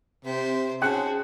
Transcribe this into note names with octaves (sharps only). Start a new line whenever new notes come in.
C3 C4 C5
C#4 F#4 G#4 C5 G5 A5 F#6 C#7